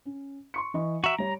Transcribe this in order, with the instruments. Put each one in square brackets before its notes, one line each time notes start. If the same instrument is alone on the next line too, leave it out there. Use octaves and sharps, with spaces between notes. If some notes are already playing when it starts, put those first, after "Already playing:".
[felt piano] C#4
C6 C#6 C#7
E3 D#5 C#6
[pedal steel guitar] F#4 E5 [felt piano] A#5 D7
[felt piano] G3 C#5 [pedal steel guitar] A#5